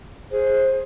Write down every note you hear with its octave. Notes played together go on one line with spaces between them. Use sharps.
G#4 C5